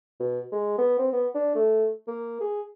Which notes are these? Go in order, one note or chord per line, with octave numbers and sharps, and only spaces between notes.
B2
G#3
B3
C4
B3
D4
A3
A#3
G#4